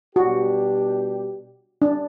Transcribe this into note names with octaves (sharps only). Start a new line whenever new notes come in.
B2 G3 D4 F#4 G4
D4